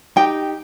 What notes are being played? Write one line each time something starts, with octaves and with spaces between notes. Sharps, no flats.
D#4 G4 G5